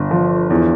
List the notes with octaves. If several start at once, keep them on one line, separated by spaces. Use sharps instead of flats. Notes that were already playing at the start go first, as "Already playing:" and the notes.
Already playing: G1
F3
E2